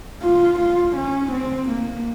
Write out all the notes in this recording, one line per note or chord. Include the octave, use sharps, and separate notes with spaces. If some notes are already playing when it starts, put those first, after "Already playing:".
F4
F4
C#4
C4
A#3